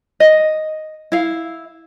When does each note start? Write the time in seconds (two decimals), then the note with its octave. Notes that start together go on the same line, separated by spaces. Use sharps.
0.20 D#5
1.12 E4 F5